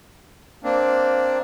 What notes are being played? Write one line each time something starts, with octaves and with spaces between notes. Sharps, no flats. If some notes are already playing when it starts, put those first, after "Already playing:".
A#3 C4 D4